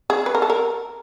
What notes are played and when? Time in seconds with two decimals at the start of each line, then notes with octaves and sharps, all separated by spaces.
0.10 G#4
0.26 B4
0.35 A#4
0.42 A4
0.50 A#4